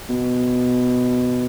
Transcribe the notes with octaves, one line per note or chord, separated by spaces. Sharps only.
B2